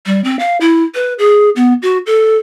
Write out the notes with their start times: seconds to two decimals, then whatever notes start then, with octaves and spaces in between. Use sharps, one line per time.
0.06 G3
0.24 C4
0.39 F5
0.61 E4
0.95 B4
1.19 G#4
1.56 B3
1.82 F#4
2.06 A4